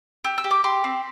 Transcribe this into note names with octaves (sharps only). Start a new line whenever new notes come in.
G4 E6
E6
G4
D6
G4 C6
C4